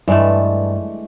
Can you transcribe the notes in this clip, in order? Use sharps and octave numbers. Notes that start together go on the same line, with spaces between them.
G2 E3 G#3 A3